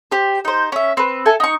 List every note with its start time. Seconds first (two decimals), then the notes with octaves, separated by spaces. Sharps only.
0.11 G4 C5
0.45 D#4 C5
0.72 C#4 E5
0.97 C4 B4
1.26 A4 E5 G#5
1.40 D#4 C#6